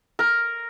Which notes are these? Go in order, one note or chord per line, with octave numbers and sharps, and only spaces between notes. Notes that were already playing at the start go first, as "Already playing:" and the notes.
A#4